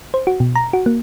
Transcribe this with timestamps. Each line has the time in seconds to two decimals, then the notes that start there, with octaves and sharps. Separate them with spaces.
0.14 C5
0.27 F#4
0.40 B2
0.56 A#5
0.73 F#4
0.86 A#3